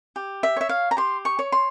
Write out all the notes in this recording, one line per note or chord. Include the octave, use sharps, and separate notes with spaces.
G4
E5
C#5 E5
F5
A#5
G4 C6
C#6
C#5
C6